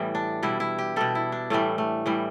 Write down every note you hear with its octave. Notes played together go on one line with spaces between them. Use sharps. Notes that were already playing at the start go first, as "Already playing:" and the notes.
Already playing: A2 E3 G3 B3
D4
B2 G3 E4
E4
G4
B2 G3 A4
E4
D4
A2 E3 G3 A3
A3
A2 E3 G3